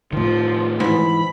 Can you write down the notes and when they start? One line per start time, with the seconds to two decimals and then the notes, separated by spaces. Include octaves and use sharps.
0.13 A2 D#3 F3
0.80 G#2 E3 B5